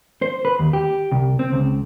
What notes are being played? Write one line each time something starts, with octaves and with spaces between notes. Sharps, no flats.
C5
B4
D#2
G4
C2
C4
C#2